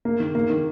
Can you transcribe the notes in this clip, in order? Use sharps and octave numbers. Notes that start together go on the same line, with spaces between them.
A#3
D#3
A#3
D#3